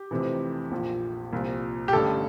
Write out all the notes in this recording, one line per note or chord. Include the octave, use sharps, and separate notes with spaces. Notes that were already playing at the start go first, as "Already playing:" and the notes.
Already playing: G4
F1 F2 C3 E3
A#1 A#2 F3
C2 A#2 F3
G4
A1 G2 D3 A4